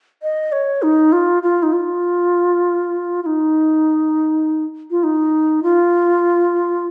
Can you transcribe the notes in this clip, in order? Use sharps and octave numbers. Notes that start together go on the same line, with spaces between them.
D#5
C#5
D#4
F4
F4
D#4
F4
F4
D#4
F4
D#4
F4